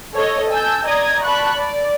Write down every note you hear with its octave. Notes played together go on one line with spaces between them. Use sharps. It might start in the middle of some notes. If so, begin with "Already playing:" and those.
A4 C#5 D#5
G#5 A5 E6 G6
D5 D#5 A#5 D#6 G#6
D5 A5 B5 C#6 F#6
D5